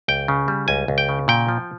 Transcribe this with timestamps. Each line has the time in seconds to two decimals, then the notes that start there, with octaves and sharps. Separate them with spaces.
0.08 C#2 G5
0.28 C#3
0.48 G3
0.68 C#2 G#5
0.88 C#2
0.98 G5
1.09 C#3
1.28 A#2 G5
1.49 F3